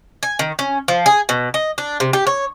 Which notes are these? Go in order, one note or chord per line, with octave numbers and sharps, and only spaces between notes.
G#5
D#3
C#4
F3
G#4
B2
D#5
D4
C3
G4
C#5